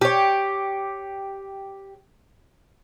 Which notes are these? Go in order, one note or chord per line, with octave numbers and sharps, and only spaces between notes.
G4 C#5